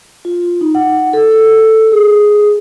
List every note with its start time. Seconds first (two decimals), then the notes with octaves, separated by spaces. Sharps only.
0.25 F4
0.61 D#4
0.75 F#5
1.13 A4
1.92 G#4